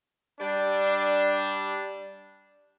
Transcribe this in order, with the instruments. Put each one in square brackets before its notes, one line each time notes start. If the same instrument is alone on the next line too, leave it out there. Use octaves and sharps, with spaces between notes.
[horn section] G3 D4